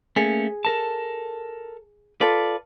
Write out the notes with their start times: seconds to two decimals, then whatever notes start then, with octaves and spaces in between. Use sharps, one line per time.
0.16 A3 A#3 C#4 G#4
0.65 A4 A#4 A5
2.21 F4 A4 B4 D5